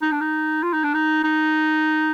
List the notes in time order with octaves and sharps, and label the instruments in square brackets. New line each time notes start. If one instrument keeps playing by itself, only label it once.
[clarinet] D#4
D4
D#4
F4
D#4
D4
D#4
D#4